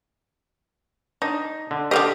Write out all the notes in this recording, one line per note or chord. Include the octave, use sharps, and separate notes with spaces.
D4 D#4
D3
D3 C4 G4 D#5 F5